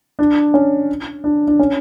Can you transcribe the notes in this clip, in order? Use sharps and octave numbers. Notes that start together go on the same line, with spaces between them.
D4
C#4
D4
D4
C#4